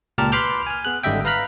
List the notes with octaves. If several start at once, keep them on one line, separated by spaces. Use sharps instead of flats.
C#2 A#2 G4 A#4 A5 F6
B4 B5 C6 D6 F6 G6
G#5 F6
B3 G#4 F#6
G#1 D3 G3 D#5 E5 G5
B4 F5 A#5 F6 F#6 B6